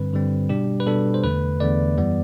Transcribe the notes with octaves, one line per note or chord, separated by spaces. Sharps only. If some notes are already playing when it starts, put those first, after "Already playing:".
Already playing: G2 D3 G3 C4 B4
G2 D3 G3 C4
B2 G3 D4 G4
B4
B2 G3 D4 A4
C5
E2 D3 A3 B4
E2 D3 A3 D5
F#2 E3 G3 B3